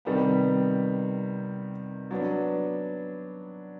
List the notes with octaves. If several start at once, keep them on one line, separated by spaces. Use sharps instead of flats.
C3 D#3 G3 B3
F#3 B3 D4